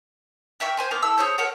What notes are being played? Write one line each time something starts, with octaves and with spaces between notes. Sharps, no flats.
A#4 E5 G5 C#6
C5 G#5 C6
A#3 B3 F5
E4 A4 E6
G#4 C5 C#5 E6
A4 A#4 C#5 F#5